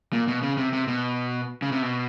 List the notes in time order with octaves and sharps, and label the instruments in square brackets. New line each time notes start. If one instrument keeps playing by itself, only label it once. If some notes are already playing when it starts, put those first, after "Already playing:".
[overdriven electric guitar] A#2
B2
C#3
C3
C3
B2
C#3
C3
B2